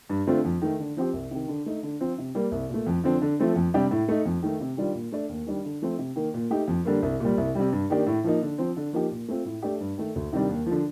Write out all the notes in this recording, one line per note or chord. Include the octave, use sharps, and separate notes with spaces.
G2
D3 A3 C4 F4
F2
D#3 A3
D3
F3 C4 G4
C2
C3 D#3
D3
A3 D#4
D3
F3 C4 F4
C3
G3 A#3
C2
A#2 A3
F2
D3 F3 C4
D3
F3 A3 C4
F2
C3 G3 D4 G4
A2
A3 D#4
F2
D#3 A3
C3
D#3 G3 D4 F4
A#2
A3 D4
D#2
D#3 G3 D4
D3
F3 A3 C4
C3
D#3 A#3
A#2
A3 D#4 G4
F2
D3 G3 A#3
C2
A#2 G3
C2
C3 G3
G2
D#3 A#3 D4 G4
A2
F3 A#3 D#4
D3
F3 C4
D3
F3 A#3 D#4 G4
A#2
A3 C4 F4
A2
A3 D4 G4
G2
D#3 A3
D2
C3 D#3 G3 D4
D#2
D3 F3